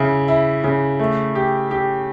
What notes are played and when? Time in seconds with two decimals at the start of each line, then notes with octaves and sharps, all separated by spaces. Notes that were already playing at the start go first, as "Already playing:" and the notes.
Already playing: C#3 E4
0.28 E4
0.64 C#3
0.99 A3
1.35 G4
1.71 G4